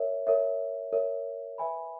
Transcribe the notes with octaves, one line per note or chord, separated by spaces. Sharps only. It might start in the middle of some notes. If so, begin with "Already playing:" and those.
Already playing: A#4 C#5 E5
A#4 C#5 E5
A#4 C#5 E5
B4 E5 G#5 B5